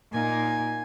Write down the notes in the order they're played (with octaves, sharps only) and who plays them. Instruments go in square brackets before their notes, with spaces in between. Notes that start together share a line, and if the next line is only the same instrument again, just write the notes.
[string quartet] A#2 A#3 D#4 G#5